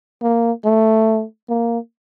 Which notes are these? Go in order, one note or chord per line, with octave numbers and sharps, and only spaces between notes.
A#3
A3
A#3